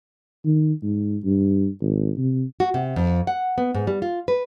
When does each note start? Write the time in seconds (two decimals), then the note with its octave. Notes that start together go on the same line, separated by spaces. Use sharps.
0.45 D#3
0.82 G#2
1.24 G2
1.81 G#1
2.17 C3
2.60 F#4
2.74 C3
2.96 F2
3.27 F#5
3.58 B3
3.75 G#2
3.87 G3
4.02 F4
4.28 B4